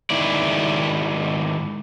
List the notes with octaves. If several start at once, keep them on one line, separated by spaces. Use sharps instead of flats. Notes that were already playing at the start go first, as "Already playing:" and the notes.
G#2 D#3 E4 D5